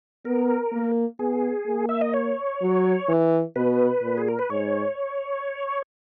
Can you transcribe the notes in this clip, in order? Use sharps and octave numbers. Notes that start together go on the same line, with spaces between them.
B3 A#4
A#3
B3 G#4
A#3
E5
D#5
C#5
F#3
E3
B2 B4
A#2
G#4
A#4
B4
G#2 C#5